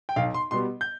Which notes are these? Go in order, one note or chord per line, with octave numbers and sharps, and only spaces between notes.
G5
B1 F5
C6
B2 G3 B3 C6
G6